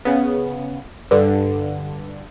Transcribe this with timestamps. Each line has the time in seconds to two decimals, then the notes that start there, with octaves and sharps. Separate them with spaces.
0.05 C#3 B3
1.11 G2 D3